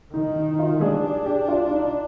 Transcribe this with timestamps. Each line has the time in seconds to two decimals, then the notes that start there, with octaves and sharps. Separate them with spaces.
0.14 D#3 D#4
0.36 D#4
0.59 F4
0.81 D4 G#4
1.04 G#4
1.26 G4
1.48 F4
1.71 D#4